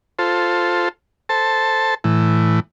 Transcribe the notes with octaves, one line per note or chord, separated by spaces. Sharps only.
F4 A4 C5
A4 C5 A5
A2 E3